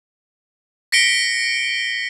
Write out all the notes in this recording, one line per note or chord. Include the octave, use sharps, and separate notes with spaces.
A#6 B6 C#7 D7 G7